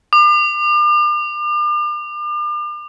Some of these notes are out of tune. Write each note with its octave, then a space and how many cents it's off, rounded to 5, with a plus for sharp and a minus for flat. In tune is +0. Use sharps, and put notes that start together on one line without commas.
D6 +40